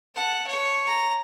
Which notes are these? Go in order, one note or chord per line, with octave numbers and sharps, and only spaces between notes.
F#5 A5
C#5
A#5